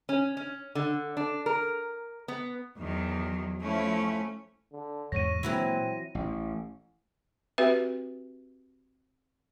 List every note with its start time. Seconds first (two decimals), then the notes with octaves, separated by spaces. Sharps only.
0.09 C#4
0.37 C#4
0.75 D3
1.17 D4
1.46 A#4
2.28 B3
2.78 E2 D#3 F#3
3.61 F3 A3 C#4 E4
4.73 D3
5.12 E2 G#2 C3 C#5 A#6 D#7
5.43 A#2 E3 F#3 G#3 C4 E4
6.15 A1
7.58 C4 F#4 G4 B4 E5